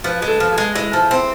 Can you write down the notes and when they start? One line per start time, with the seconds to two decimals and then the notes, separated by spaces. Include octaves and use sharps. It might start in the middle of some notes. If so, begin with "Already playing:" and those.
0.04 F3 B4
0.22 G#3
0.28 A4
0.40 F3
0.52 G#4
0.58 G#3
0.75 G#3 E4
0.93 F3
1.11 C4